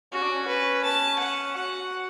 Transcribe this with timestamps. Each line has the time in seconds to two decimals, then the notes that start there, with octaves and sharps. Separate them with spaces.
0.12 C#4 F#4
0.22 D4
0.32 C#4
0.48 B4
0.84 A5
1.19 F#5
1.56 F#4 F#5